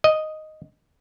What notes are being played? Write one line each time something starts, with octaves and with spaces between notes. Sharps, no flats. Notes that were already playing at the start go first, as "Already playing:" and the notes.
D#5